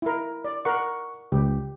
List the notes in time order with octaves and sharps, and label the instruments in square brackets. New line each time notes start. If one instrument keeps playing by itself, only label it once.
[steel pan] E4 A#4
D5
[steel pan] A#4 F#5 [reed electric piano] C#6
[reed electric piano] C#2 [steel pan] G4